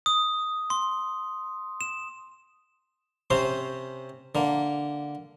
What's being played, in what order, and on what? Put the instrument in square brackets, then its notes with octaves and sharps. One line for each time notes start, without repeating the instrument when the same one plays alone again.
[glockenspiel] D#6
C6
E7
[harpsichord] C3 C#4 C5 C6
D3 A#3